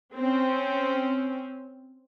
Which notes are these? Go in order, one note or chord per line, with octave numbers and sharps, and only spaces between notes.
C4 C#4